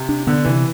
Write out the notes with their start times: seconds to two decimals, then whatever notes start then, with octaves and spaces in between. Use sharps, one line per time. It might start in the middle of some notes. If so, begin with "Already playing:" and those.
Already playing: C3
0.09 D4
0.27 D3 B3
0.45 C3 E3